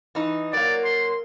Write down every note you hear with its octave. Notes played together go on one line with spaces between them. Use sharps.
E3 D#4
F#3 A#3 A#4 D5
C6